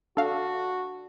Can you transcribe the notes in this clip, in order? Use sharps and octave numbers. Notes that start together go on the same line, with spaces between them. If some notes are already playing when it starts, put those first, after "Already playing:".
D4 F#4 A4 F5